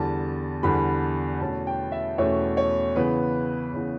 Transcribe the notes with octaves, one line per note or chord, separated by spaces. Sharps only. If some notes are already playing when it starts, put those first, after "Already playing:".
Already playing: E2 D3 G3 A5
E2 D3 G3 B5
E2 B2 A3 C#4 A5
G5
E5
E2 B2 A3 C#4 C#5
C#5
C#3 E3 B3 B4
C#3 E3 B3